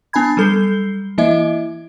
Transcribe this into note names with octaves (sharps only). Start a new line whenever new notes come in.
B3 D4 G#5 A5 B5 G#6
F#3 G3 A4 G6 C7 G7
E3 A#3 E4 D#5 E5